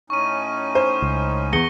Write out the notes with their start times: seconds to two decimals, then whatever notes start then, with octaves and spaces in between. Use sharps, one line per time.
0.10 A2 C#4 D#4 C#6 D#7
0.75 C5
1.02 C#2
1.53 E2 A#6 C#7 G7